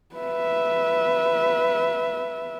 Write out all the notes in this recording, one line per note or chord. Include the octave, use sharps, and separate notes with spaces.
B4 E5